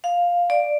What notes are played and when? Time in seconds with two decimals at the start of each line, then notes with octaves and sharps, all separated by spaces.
0.04 F5
0.50 D5